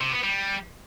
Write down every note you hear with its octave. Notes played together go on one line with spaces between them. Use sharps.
C3
B3
G3